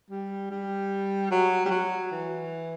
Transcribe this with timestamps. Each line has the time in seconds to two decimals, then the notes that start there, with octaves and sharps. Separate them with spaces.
0.11 G3
0.51 G3
1.31 F#3
1.66 G3
1.71 F#3
2.12 E3